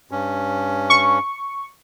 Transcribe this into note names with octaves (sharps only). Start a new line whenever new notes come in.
G2 C#4
C#6